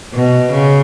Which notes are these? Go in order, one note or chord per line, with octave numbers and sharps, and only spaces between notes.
B2
C#3